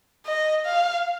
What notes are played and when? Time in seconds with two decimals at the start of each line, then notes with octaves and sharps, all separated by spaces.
0.26 D#5
0.65 F5